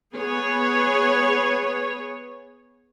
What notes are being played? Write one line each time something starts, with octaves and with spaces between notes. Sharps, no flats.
B3 G#4 B4 C#5